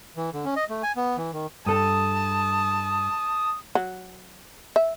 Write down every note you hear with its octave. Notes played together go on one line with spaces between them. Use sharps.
E3
D3
C#4
D#5
A3
G#5
B3
E3
D#3
G2 A4 A5 D#6
F#3
E5